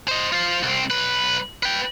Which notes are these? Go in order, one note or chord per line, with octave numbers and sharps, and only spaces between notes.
C5 D#5
F4 C5
C2 C4
B1 B4
B4 G5